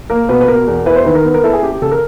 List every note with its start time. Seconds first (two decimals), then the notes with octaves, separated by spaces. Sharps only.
0.10 A#3 A#4
0.29 B2 B4
0.41 B4
0.48 B2 A#4
0.67 E2
0.86 E4 B4
0.95 C5
1.05 D#3 B4
1.15 A#4
1.25 B3
1.34 A#4
1.44 E4 A4
1.53 G#4
1.62 C#4 G4
1.73 G4
1.82 C#3 A4
1.91 A#4